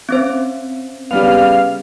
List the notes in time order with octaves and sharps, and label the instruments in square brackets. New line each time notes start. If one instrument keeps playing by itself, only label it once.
[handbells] C4 C#4 C5
[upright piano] C#3 G3 B3 [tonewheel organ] F5